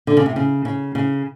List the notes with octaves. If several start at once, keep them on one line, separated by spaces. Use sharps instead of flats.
D3
C#3
C3
C#3
C#3
C#3